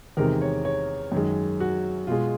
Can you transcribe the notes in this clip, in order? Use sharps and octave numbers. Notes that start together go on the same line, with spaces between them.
E2 C3 D#3 G#3 A#4
C#5
C#5
F#2 D#3 G#3
F#4
B2 G#3 F4